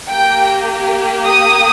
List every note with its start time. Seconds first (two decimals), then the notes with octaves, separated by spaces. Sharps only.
0.10 A#3 G4 G5
1.26 D#6